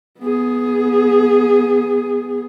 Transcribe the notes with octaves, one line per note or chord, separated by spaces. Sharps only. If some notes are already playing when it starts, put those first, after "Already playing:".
B3 G#4